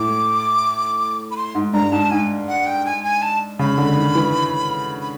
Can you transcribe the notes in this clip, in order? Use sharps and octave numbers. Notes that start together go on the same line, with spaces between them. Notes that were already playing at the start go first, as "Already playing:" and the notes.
Already playing: A2 D6
B5
C6
G#2
G2 A#5
G#2 A5
G#2 G#5
F#5
G5
G#5
G#5
A5
C#3 B5
D3
D#3
E3
B5